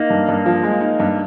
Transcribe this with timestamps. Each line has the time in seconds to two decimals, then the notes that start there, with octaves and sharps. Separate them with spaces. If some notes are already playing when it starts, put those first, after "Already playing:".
Already playing: A#3 D#4
0.10 G2
0.29 G2
0.46 F3
0.63 G#3
0.81 D#4
1.00 G2